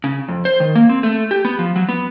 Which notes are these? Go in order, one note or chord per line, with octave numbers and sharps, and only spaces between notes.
C#3
F2
C5
D#3
A#3
C4
A3
G4
B3
F3
F#3
B3